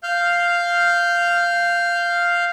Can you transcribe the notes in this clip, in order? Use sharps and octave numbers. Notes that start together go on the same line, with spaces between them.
F5 F6 G6